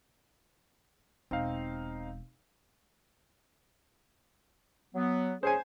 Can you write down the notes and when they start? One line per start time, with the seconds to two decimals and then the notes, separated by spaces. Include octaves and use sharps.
1.31 E1 C4 D#4 F5
4.95 F#3 B3
5.43 C#4 G#4 C5 G#5